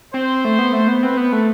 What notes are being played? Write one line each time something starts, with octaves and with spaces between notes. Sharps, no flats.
C4 C5
A3
B3
A3
B3
C4 B4
B3
A3